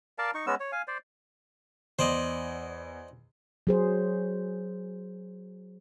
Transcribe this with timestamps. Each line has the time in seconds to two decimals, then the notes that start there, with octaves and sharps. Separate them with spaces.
0.18 A#4 D5 F5 A5
0.35 D#4 C#6
0.47 G#3 B3 C#4 E6
0.60 C#5
0.72 F5 G#5
0.88 C5 D5
1.99 E2 C5 D5 D#5
3.67 F#3 G#4 C5